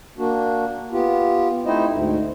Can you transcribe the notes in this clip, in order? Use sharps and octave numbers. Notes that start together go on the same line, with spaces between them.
A#3 D4 F#4
B3 F4 G4
A3 C4 D#4 E4 C5 D#5
D2 G#2